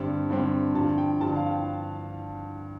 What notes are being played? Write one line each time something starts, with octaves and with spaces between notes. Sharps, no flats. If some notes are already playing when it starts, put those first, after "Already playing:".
Already playing: G2 D3 G3 C4 A5
G2 D3 G3 C4
G2 D3 F3 A5
G5
G2 D3 F3 A5
F5
G5